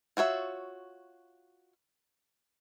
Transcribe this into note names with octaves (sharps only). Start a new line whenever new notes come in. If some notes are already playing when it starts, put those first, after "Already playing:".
F4 F#4 C#5 E5